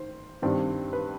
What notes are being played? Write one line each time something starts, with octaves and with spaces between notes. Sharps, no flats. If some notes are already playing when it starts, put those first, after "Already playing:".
Already playing: D#3 C5
G2 D#3 G3 C4
B4